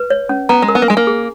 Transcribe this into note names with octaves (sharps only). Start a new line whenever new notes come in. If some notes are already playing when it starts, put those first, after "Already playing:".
Already playing: B4
C#5
C#4
B3 A#5
G#3
A#4
B3
A#3
G#3 G#5
A#3
G#4